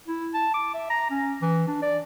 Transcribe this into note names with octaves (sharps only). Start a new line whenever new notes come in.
E4
A5
D6
E5
A#5
C#4
E3
D4
D5